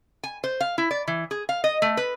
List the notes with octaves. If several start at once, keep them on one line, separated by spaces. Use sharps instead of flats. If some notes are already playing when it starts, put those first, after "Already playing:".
G#5
C5
F5
E4
D5
E3
G#4
F5
D#5
A3
B4